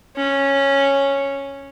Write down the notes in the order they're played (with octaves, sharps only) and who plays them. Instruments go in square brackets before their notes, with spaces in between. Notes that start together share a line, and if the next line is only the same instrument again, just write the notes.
[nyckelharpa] C#4